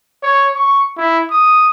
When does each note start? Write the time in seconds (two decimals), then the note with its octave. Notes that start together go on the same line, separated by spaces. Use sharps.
0.23 C#5
0.55 C#6
0.97 E4
1.31 D#6